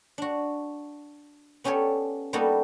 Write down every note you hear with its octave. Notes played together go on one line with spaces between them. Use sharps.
D4 F#4
B3 C#4 G4 A4 C#5 D5
G3 A#3 B3 D#4 F#4 A4